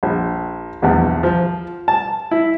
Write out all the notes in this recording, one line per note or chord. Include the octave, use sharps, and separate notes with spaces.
A#1
A#1 E2
F3
A5
E4